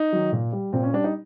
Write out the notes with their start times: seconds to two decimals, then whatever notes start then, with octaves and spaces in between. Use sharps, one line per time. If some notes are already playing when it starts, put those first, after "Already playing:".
Already playing: D#4
0.13 D#3 F#3
0.33 A#2
0.52 G3
0.73 A#2 C4
0.83 C#4
0.93 G3 D4
1.04 D#4